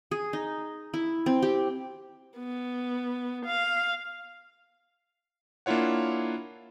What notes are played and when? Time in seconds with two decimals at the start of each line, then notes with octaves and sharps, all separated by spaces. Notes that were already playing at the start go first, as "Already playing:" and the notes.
0.11 G#4
0.33 D#4
0.94 E4
1.26 C4
1.42 G4
2.38 B3
3.46 F5
5.66 A#3 D4 E4 F4 C#5 F#5